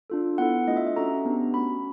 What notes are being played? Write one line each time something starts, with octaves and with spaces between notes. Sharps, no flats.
D4 F4 A4
B3 E4 A4 F#5
A3 D4 F4 A4 D#5
E5
E5
C#4 F#4 A4 A#5
B3 D4 G4
A3 C#4 F#4 B5